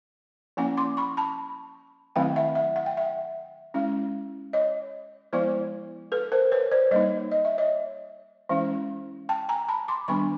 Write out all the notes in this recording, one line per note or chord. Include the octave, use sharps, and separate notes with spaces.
F3 A#3 C#4 E4 F#5 G#5
C6 D6
B5 C#6
A5 B5
D#3 F#3 A3 C4 E4 F5 G5
E5 F#5
E5 F#5
F#5
G5
E5 F#5
G#3 C#4 E4
C#5 D#5
F3 G#3 B3 E4 C5 D5
A4 B4
A#4 C5
B4 C#5
C5 D5
G3 A#3 D#4 C#5 D#5
D#5
E5
C#5 D#5
E3 G#3 C#4 E4
G5 A5
G#5 A#5
A5 B5
C6 D6
D#3 G3 B3 D4 B5 C#6